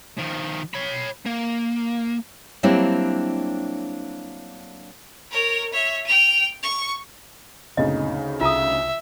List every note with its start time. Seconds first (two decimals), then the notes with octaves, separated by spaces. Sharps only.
0.18 D#3 F3
0.74 C#5 B5
1.26 A#3
2.63 F#3 G3 A#3 C4 D4 E4
5.31 A#4 C#5
5.73 C#5 E5
6.06 G5 F7
6.63 C#6
7.77 F#1 D2 A#2 C#3 C4 D#4 D#5
8.41 C2 F4 E5 A5 D#6